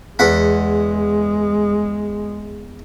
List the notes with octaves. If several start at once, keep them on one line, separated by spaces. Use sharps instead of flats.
E2 G#3 F#5 B5